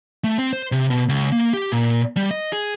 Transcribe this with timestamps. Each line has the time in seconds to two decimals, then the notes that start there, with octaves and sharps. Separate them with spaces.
0.24 A3
0.38 C4
0.53 C5
0.72 C3
0.90 B2
1.09 C#2
1.32 A#3
1.53 G4
1.72 A#2
2.17 G3
2.31 D#5
2.53 G#4